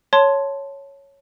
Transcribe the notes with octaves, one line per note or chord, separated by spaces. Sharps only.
C#5 A5 C6